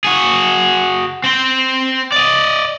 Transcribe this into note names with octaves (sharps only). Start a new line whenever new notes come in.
F#4 G#4
C4 C5
D5 D#5